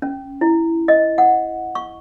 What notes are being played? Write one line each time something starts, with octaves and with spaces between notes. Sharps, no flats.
C#4
E4
D#5
F#5
C#6